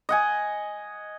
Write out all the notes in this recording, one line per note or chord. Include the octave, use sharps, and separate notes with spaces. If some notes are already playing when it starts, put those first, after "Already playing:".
D#5 F#5 G#5